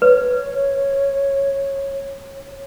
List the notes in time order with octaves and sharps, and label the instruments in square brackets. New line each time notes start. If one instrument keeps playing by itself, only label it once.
[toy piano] B4 [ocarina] C#5